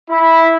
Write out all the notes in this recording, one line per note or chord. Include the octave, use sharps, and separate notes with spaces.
E4